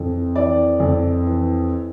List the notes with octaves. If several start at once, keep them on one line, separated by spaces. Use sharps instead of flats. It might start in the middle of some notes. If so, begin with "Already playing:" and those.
Already playing: F2 E3
E3 D5
F2
E3